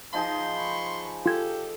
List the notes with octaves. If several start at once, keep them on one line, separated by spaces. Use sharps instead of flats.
F3 D#4 G#4 C6
B5 C#6
F4 G4 A4 G#6